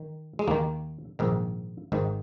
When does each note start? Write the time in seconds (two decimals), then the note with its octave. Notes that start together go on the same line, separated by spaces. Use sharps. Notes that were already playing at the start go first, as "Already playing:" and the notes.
Already playing: D#3
0.39 G#3
0.47 D#2 D#3 A#3
1.19 A#1 G#2 D#3
1.92 G#1 G#2 D#3